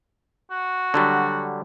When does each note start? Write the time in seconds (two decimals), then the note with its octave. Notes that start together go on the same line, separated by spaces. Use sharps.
0.51 F#4
0.94 D3 F#3 G3